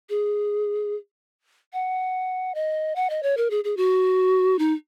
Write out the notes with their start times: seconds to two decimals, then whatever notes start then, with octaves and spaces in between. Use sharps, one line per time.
0.10 G#4
1.73 F#5
2.55 D#5
2.96 F#5
3.10 D#5
3.23 C#5
3.37 A#4
3.50 G#4
3.64 G#4
3.77 F#4
4.59 D#4